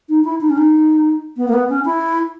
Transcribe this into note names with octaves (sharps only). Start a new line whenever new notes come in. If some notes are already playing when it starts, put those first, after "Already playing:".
D#4
E4
D#4
C#4
D#4
B3
A#3
B3
C#4
E4